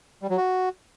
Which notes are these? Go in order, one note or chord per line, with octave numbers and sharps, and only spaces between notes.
G3
F#3
F#4